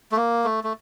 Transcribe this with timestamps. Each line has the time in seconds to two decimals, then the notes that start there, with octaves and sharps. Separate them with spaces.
0.12 A3
0.16 A#3
0.44 A3
0.64 A3